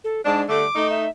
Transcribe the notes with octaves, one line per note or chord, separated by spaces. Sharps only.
A4
G#2 D4 A5
D3 G3 A3 D6
A3 D#4
E5